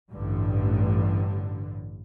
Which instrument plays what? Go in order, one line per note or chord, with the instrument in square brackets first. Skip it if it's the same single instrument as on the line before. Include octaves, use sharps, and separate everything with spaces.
[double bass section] A1 G2 D3